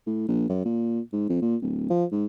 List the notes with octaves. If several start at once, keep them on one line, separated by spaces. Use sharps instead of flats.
A2
A#1
F#2
A#2
G#2
F2
A#2
D1
F3
G#2